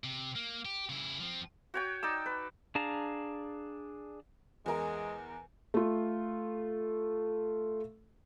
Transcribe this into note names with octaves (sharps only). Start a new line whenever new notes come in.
C3
A#3
G4
C#3 E4
F3 C4
F#4 C#5 G5
D#4 D5 E6
B4
D4 G#4 F5 A5 A#5
E2 G#3 A#4
A3 F4